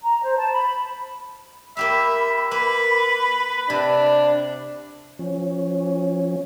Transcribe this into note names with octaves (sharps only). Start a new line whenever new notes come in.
A#5
C5
A5
B5
A#3 G4 E5 F5 B5
A#3 B4
C3 D4
F3 C#4